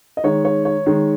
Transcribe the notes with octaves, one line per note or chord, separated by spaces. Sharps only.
D#5
D#3 G#3 C#5
C#5
C#5
D#3 G#3